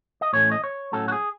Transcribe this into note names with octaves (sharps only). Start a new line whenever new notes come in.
D#5
A2 E3 A3 C#4 C#5
D#5
C#5
A2 F#3 C#4 A4
F#4
G#4